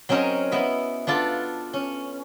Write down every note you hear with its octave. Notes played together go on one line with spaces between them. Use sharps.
F#3 C4 C#4 D#4 A#4 C#5
B3 E4 D#5 E5
B3 D4 F4 A4
C#4